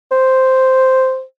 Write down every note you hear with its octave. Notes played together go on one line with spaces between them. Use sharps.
C5